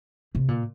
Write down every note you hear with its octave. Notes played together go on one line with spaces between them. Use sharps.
C3
A#2